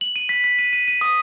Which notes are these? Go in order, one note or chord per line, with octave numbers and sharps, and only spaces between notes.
F#7
D#7
B6
B6
D#7
D#7
D#7
D#6